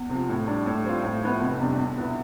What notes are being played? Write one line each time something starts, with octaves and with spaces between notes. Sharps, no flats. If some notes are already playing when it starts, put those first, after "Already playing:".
Already playing: E2
C3 F3
A2
G3 D4
A2
G3 C4 F4
A2
F3 B3 E4
F1
E2 C3 G3 D4
E2
B2 B3 E4